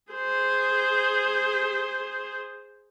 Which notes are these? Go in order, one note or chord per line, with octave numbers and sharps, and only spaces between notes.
G#4 C5